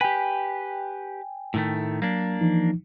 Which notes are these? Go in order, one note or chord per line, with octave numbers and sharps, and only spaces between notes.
G4 B4 G5 G#5
A2 D#3 A3
F#3 A#3 D4
E3 F3 D#4